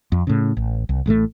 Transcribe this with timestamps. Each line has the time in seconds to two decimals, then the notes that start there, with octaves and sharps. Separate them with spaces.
0.12 F2
0.27 A2 C#3
0.57 A1
0.89 C2
1.06 A1 A2 G3 A3